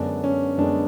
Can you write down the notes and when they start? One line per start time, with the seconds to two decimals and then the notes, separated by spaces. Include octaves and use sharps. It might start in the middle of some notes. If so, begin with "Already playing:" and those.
Already playing: F#2 D3 G#3 B3 D4
0.24 C#4
0.57 F#2 D3 G#3 B3 D4